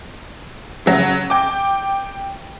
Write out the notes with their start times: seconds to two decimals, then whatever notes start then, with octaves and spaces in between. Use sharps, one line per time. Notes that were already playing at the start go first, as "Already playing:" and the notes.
0.86 C#3 F#3
1.30 G5 D6